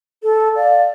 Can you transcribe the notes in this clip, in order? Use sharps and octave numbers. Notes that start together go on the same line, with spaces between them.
A4
D5 F5